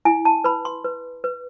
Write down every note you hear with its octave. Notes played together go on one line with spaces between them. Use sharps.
E4 G#5
A5
B4 B5
C6
B4
B4